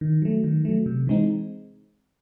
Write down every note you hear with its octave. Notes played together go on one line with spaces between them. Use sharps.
D#3
F#3 A3
D#3
F#3 A3
C3
E3 G#3 C4 D#4